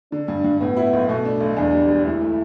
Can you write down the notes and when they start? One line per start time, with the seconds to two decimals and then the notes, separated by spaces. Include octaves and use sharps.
0.12 D3 D4
0.28 G2
0.44 G2
0.60 A2 B3
0.76 E4
0.93 B1
1.09 B2 A3
1.25 D4
1.41 B1
1.57 E2 D4
1.74 G3
1.90 E1
2.05 D2 E4
2.21 A3